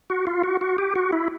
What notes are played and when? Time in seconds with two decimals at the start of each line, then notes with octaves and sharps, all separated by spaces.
0.10 F#4
0.27 F4
0.43 F#4
0.61 F#4
0.78 G4
0.95 F#4
1.13 E4